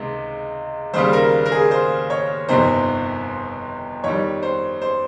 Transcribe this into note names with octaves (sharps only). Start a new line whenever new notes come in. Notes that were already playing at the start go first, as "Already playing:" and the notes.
Already playing: C#2 C3 D#3 G#3
D#2 C#3 G3 C5
A#4
A#4
G#4
C5
C#5
G1 F2 C3 D#3 C5
F2 D#3 G3 C#5
C5
C5